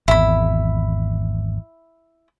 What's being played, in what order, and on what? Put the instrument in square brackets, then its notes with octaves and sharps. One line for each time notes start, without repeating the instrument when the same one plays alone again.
[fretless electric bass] G#1 E2 [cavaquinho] E4 B5